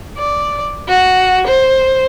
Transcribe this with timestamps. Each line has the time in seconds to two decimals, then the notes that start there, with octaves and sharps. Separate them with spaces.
0.18 D5
0.88 F#4
1.47 C5